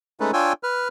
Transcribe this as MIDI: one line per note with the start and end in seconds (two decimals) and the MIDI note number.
0.20 0.31 56
0.20 0.31 57
0.20 0.31 61
0.20 0.31 63
0.20 0.31 69
0.20 0.31 71
0.33 0.53 62
0.33 0.53 65
0.33 0.53 73
0.33 0.53 79
0.33 0.53 80
0.33 0.53 88
0.63 0.88 71
0.63 0.88 89